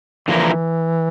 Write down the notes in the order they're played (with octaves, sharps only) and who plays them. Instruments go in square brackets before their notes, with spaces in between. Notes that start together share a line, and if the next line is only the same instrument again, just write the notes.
[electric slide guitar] D3 F3 A#3 E4 A#4 [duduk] E3